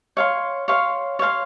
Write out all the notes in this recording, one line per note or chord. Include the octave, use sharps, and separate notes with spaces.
C#5 F5 C6
C#5 F5 C6
C#5 F5 C6